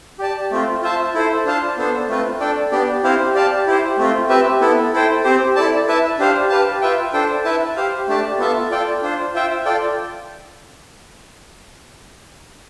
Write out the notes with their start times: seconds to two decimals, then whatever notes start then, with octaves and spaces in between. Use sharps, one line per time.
0.19 G4 D5 A5
0.51 A3 C4 F4
0.82 F4 C5 E5 A5
1.14 E4 A4 C5
1.45 D4 F4 C5 F5 A5
1.77 B3 D4 A4 C5
2.09 A3 C4 F4 B4
2.40 D4 A4 D5 G5
2.72 B3 D4 G4 D5
3.03 C4 E4 G4 C5 F5
3.35 G4 D5 F5 A5
3.67 E4 G4 C5
3.98 A3 C4 F4
4.29 C4 G4 B4 E5
4.61 B3 E4 A4
4.93 E4 A4 C5 G5
5.24 C4 G4 C5
5.56 E4 A4 D5 A5
5.87 E4 B4 E5 A5
6.19 D4 G4 C5 F5
6.50 G4 B4 F5 A5
6.81 F4 B4 E5 G5
7.13 D4 A4 C5 G5
7.44 E4 B4 E5 A5
7.76 G4 C5 F5
8.08 A3 D4 G4 D5 A5
8.39 B3 F4 A4 E5 A5
8.71 F4 A4 D5 G5
9.02 D4 F4 C5
9.34 F4 C5 E5 G5
9.66 F4 A4 D5 G5